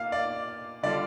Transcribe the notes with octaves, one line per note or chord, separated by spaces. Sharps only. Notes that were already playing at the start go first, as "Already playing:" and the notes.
Already playing: A#2 A#3 F5
D5
D3 G3 D4 F4 D5